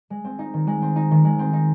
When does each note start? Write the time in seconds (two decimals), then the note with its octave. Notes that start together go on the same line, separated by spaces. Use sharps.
0.10 G#3
0.24 C4
0.39 D#4
0.54 D#3
0.67 G#3
0.82 C4
0.96 D#4
1.11 D#3
1.25 G#3
1.39 C4
1.53 D#4